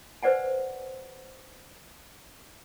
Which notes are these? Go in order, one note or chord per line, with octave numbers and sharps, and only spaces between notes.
B4 C5 D5 F#5 G#5